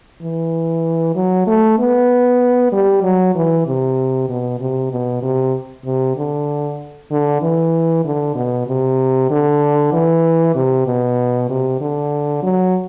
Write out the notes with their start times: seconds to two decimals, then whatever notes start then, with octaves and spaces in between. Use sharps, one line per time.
0.22 E3
1.15 F#3
1.47 A3
1.79 B3
2.72 G3
3.03 F#3
3.35 E3
3.66 C3
4.29 B2
4.60 C3
4.91 B2
5.22 C3
5.85 C3
6.16 D3
7.11 D3
7.42 E3
8.05 D3
8.35 B2
8.67 C3
9.30 D3
9.93 E3
10.55 C3
10.86 B2
11.49 C3
11.81 D3
12.43 F#3